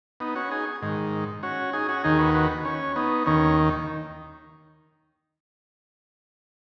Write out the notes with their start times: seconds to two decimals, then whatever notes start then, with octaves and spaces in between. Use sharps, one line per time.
0.20 B3 D#4
0.35 C#4 F#4
0.51 D#4 G#4
0.82 G#2 D#3
1.43 C#4 F#4
1.73 D#4 G#4
1.89 C#4 F#4
2.04 D#2 D#3 D#4 G#4
2.19 F#4 B4
2.34 F#4 B4
2.65 C#4
2.96 B3 D#4
3.26 D#2 D#3 C#4